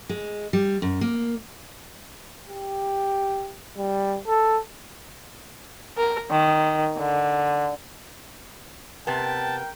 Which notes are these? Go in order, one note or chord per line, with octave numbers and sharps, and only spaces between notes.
G#3
G3
F#2
A#3
G4
G3
A4
A#4
D#3
D3
C3 B3 A#4 G5 A5